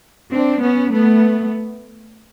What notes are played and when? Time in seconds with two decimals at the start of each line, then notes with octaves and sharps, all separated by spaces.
0.32 C4 D4
0.62 B3 C#4
0.93 A3 B3